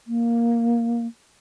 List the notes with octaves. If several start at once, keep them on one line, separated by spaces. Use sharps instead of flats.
A#3